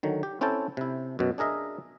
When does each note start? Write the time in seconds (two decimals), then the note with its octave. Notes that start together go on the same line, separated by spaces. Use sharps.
0.03 D3 D#3 F#3
0.23 G4
0.41 C4 C#4 E4 A4 G5 A5
0.77 C3 E4
1.19 F#2 B2
1.38 D4 G#4 A#4 D#5 E5